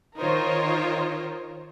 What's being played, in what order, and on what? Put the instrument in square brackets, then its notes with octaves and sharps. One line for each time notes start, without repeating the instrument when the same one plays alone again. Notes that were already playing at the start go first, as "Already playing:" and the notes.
[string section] D#3 D#4 F4 A#4 C5 C#5